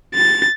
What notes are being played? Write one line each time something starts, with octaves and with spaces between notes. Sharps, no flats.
A6